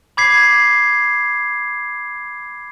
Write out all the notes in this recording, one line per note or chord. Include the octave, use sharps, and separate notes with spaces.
B5 D6 G#6 B6 C7